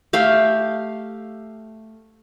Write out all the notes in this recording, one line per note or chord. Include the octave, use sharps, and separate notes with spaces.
A3 G4 F5